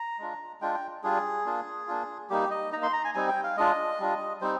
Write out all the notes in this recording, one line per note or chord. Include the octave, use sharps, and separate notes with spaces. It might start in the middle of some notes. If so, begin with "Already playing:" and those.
Already playing: A#5
G#3 D4 F4
G#3 D4 F4 G5
G5
G3 D4 F4 G#4
A#3 D4 F4
A#3 D4 F4
G3 A#3 D#4 G4
D#5
A#3 D#4 A#5
C6
A#5
G#5
G3 C4 D#4 G#5
G5
F5
G#3 D4 F4 D#5
G3 D4 F4
G3 C4 D#4 C5